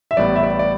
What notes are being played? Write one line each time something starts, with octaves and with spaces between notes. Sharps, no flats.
E5
A1 A2 G3 B3 D5
E5
D5
D5